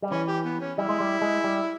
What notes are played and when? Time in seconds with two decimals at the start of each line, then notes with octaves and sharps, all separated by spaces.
0.02 G3
0.11 E3 C#4
0.27 G4
0.45 B3
0.61 C#4
0.78 G3 E4
0.89 G#3
1.00 G3
1.22 G#3
1.44 G3